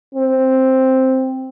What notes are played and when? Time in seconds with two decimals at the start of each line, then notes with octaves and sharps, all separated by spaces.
0.15 C4